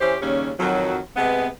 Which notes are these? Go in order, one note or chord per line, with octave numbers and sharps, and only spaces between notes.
E3 C#4 G4 C5
D#2 C#3 G3 C#4
F2 D#3 F#3
C3 G#3 B3